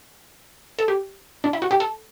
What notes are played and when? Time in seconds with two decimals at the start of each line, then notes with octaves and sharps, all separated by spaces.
0.79 A4
0.88 G4
1.44 D4
1.53 E4
1.62 F#4
1.71 G4
1.80 A4